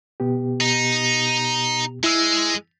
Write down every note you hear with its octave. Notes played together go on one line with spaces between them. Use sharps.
B2 B3 G4
D#4
G#3 E4 E6